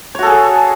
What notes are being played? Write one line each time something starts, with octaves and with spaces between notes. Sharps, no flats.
F#4 G#4 A4 C#5